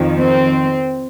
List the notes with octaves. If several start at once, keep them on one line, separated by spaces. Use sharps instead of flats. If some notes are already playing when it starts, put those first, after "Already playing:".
Already playing: F2 D#3
C4